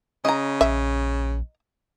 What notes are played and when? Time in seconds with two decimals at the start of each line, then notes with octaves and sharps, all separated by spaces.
0.25 C#3 D#5 A#5
0.61 A#1 E5